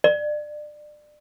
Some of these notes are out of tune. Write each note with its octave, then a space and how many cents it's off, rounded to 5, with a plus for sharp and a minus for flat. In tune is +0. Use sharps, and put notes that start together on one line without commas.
D5 +25